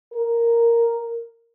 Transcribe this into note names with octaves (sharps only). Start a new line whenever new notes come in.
A#4